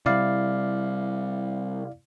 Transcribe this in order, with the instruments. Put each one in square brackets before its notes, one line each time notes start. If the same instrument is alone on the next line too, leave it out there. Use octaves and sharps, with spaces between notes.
[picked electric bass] C3 G3 [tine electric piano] E4 D5 F5